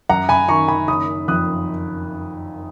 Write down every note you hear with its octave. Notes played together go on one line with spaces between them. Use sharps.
F#2 F#5 A#5
G#5 B5
D#3 A#5 C#6
G#5 B5
F#1 B5 D#6
F2 D#6 F#6